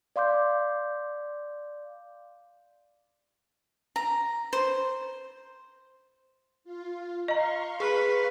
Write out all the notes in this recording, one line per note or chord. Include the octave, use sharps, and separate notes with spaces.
D5 F5 C6 D6 G6
A#5
C5
F4
D#5 F5 A#5 C6 C#6
G#4 B4